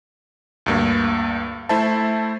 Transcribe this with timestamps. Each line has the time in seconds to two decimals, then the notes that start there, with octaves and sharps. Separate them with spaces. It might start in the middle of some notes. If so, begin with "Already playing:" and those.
0.66 D2 G2 A#3
1.69 A3 E4 C5 E5 A5